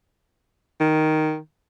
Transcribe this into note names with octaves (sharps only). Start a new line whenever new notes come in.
D#3